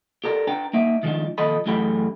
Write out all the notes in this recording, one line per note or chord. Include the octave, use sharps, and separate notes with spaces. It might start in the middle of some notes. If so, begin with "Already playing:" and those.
G4 A4 A#4 C#5 D5
D4 B4 G5 A#5
A#3 D#4 E5
D#3 F3 G#3 D4 D#4
D#2 A#2 F3 A4 D#5 B5
F#2 E3 A3 G4 G#4 B5